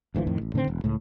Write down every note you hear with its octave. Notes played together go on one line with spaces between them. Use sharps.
G#1 D2 E3 F3
F2 A2 D#3
A1
A2 D3 D#3 C4
E1
C#2 A2